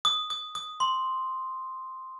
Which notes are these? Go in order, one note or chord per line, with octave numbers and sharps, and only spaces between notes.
D#6
D#6
D#6
C6